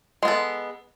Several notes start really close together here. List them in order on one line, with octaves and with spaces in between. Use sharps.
G#3 B3 A4